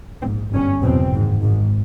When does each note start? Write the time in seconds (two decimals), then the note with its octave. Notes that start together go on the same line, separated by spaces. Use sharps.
0.22 A#1 G#2 C4
0.52 G1 G2 C#4
0.82 F#1 E2 B2 C4
1.11 G#1 G#2
1.41 G#1 G#2